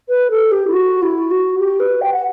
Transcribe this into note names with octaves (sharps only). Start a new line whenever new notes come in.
B4
A4
G4
E4
F#4
E4
F#4
G4
B4
G5
F#5